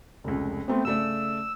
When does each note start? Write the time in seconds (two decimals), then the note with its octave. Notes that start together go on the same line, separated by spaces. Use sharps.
0.24 F1 C#2
0.68 A3 B3 C4
0.85 C#3 A3 D5 E6